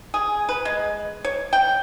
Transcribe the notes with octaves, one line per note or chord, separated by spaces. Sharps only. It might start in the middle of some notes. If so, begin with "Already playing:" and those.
G#4
B4
G#3
C#5
G5